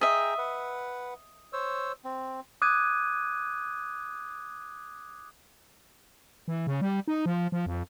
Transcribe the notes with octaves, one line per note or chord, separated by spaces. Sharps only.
G#4 D#5 E5 G5 A#5
B4 F#5
C5 C#5 E6
C4
D6 D#6 F#6 G#6 D#7
E3
C#3
G3
D#4
F3
F3
F2